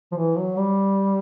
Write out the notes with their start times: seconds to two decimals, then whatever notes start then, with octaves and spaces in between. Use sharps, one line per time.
0.12 F3
0.17 E3
0.38 F#3
0.58 G3